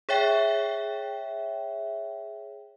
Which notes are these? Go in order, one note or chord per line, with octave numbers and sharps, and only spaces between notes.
G#4 C#5 E5 G5